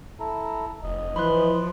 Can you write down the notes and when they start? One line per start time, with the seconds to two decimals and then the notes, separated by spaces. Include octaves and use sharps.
0.20 E4 A4 A#5
0.84 F1 D#5
1.16 E3 F3 B5 C6 F#6